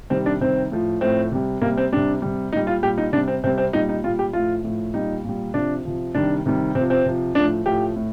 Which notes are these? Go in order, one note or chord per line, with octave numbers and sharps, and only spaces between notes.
C3 D#3 G3 C4
D4
C3 D#3 G3 C4
A2 F3
A2 F3 C4
C3 G3
C3 G3 A#3
C4
C3 G3 D4
C3 G3
A#2 G3 D#4
F4
A#2 G3 G4
D#4
C3 G3 D4
C4
C3 G3 C4
C4
A#2 G3 D#4
D#4
A#2 G3 F4
G4
A2 F3 F4
A2 F3
A#2 G3 D#4
A#2 G3
C3 F3 D4
C3 F3
C3 D#3 G3 D4
C3 D#3 G3
C3 C4
F3
C4
C3 F3
A2 F3 D4
A2 F3 G4
A2